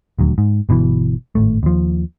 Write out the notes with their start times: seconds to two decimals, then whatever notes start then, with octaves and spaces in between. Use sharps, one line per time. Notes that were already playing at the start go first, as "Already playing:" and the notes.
0.19 D#1 D2 F#3
0.38 G#2
0.69 G1 B2 D3 E3
1.35 G#1 A2 A3
1.63 D#2 F3